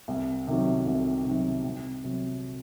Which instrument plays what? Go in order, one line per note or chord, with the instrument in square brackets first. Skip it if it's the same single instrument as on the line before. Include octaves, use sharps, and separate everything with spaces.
[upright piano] C2
C3 D#3 F#3
C2
C3 D#3 F#3
C2
C3 F#3